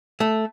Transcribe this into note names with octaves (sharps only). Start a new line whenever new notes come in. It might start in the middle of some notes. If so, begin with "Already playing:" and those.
A3